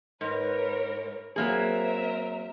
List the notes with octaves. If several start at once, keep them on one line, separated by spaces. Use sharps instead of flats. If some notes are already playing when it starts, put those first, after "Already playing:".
G#2 A#4 B4 C#5
F#3 A#3 C4 G#4 A#4 E5